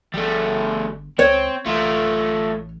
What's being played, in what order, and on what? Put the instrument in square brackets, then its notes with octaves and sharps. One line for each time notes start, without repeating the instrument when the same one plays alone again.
[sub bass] G1 [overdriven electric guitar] G3 A3
[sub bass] C#2 [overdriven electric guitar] C4 [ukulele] C#5
[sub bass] A1 [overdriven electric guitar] A3 F4